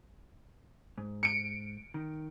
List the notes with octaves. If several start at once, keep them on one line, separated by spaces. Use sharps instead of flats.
G#2
C#7 D7
D#3